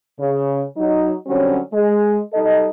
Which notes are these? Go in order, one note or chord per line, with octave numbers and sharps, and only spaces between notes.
C#3
F#3 D#4
D3 F#3 G3 C4 C#4 F#4
G#3
G3 D#4 A4 D#5